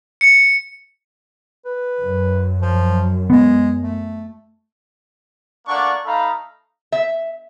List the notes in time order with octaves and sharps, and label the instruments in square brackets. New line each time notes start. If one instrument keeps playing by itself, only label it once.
[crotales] C#7
[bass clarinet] B4
[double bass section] F#2
[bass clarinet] F3
[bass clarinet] G#3 [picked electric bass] B3
[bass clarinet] A3
[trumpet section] A3 A#3 D4 D5 F#5 C#6
A3 D#4 A4 F5 A#5 B5
[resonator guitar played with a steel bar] E5